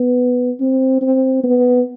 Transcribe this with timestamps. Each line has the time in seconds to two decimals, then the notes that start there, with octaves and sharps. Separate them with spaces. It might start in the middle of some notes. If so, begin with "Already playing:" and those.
Already playing: B3
0.60 C4
1.02 C4
1.44 B3